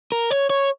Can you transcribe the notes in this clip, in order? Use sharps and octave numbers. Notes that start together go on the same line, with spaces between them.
A#4
C#5
C#5